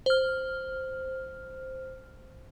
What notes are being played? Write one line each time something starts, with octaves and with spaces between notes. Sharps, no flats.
C5 F6